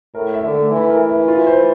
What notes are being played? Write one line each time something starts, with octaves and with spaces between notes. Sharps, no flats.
A2 A#4
E5
D3
A3
E3 E4
A#4
E3
E5
F4
C5